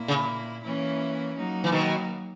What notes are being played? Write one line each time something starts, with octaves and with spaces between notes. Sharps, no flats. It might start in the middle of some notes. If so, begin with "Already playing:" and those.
Already playing: A#2 A#3 E4
C#3
E3 A#3 C#4 E4
F#3 A#3 D#4
E3
B2 D#3